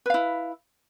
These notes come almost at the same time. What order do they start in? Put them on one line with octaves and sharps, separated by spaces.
B4 F5 E4